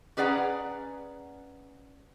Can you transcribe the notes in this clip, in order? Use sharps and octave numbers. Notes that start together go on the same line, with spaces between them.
C#4 G#4 B4 D5 F#5 A#5